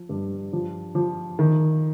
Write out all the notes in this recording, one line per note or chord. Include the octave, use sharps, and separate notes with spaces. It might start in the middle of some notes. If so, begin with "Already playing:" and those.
Already playing: F3
G2
F3
F3
D#3